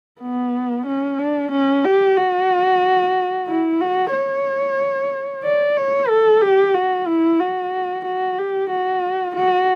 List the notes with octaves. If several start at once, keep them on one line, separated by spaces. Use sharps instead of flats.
B3
C#4
D4
C#4
G4
F#4
E4
F#4
C#5
D5
C#5
A4
G4
F#4
E4
F#4
F#4
G4
F#4
F#4